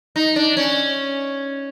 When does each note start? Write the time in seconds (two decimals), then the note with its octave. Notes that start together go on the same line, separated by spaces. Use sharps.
0.16 D#4
0.36 D4
0.57 C#4